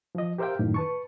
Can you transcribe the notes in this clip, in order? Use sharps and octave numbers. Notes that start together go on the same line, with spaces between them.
F3 D#5
G4 A#4 C5 E5 F5 G5
F#2 A2 D#3
B4 A5 C#6